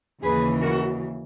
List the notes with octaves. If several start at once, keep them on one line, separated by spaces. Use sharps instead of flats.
D#2 C#3 E3 G#4 B4
F#4 A#4